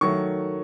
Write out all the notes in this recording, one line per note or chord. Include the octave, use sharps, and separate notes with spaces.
D#3 F#3 A3 C#6